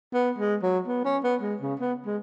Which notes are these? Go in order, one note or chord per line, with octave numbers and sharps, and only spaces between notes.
B3
G#3
F#3
B3
C#4
B3
G#3
C#3
B3
G#3